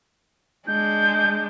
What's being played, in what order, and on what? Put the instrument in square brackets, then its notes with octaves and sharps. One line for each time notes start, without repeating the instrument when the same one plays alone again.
[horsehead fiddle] G#3 D4 [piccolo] G6